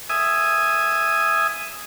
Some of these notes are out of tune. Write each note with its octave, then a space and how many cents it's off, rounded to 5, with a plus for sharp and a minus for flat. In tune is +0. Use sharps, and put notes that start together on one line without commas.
E5 +10 G#5 +0 D#6 +0